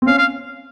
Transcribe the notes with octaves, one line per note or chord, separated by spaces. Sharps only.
C4
C#4 F5
F5